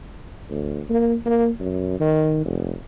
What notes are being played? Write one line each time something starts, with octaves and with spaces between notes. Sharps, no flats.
D2
A#3
A#3
F#2
D#3
F1